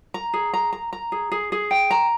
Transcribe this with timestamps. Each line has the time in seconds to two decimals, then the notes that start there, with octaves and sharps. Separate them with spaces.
0.14 A#5
0.34 G#4
0.54 A#5
0.73 A#5
0.93 A#5
1.12 G#4
1.32 G#4
1.52 G#4
1.71 G5
1.91 A#5